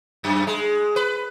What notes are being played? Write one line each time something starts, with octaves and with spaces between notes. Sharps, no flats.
F#2
G#3
B4